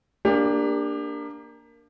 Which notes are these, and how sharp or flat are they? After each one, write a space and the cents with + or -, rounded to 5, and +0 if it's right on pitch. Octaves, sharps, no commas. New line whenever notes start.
A#3 +0 D4 +0 G4 +30